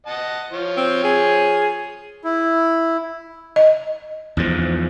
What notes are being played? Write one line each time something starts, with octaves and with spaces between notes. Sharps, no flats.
D#5 F#5 A5
F3 C#5
C4
G#4
E4
D#5
E2 G#2 F3